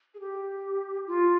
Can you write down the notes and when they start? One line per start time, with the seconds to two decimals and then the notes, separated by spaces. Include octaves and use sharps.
0.14 G#4
0.19 G4
1.07 F4